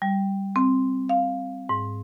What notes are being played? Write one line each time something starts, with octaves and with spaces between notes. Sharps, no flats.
G3
C4
F5
G#2